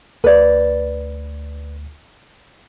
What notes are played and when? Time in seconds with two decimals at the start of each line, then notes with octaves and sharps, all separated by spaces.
0.24 D2 B4 D5